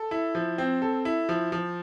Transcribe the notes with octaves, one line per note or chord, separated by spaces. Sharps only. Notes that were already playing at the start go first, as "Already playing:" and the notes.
Already playing: A4
E4
F3
C4
A4
E4
F3
F3